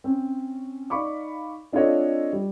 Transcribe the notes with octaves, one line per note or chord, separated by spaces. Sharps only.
C4 C#4
D#4 D5 F5 B5 C#6 D6
C4 D4 F4 A4 C#5 D#5
G3